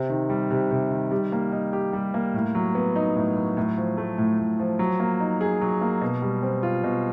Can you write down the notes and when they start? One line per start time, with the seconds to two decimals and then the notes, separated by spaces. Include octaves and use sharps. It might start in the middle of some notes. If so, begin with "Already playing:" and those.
Already playing: C3
0.10 D#3
0.30 G3
0.51 C3
0.71 C3
0.91 D#3
1.12 G3
1.32 A#3
1.52 D#4
1.73 G4
1.93 G3
2.14 A#3
2.34 A2
2.55 F#3
2.75 B3
2.96 D#4
3.16 A2
3.36 F#3
3.57 A2
3.78 F3
3.97 A3
4.18 A2
4.39 A2
4.59 F3
4.79 F#3
5.00 A#3
5.20 D#4
5.41 G#4
5.61 F#3
5.81 A#3
6.02 B2
6.22 G3
6.42 C4
6.63 F4
6.84 B2